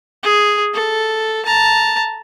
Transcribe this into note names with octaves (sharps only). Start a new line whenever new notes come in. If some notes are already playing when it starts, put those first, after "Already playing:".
G#4
A4
A5 A#5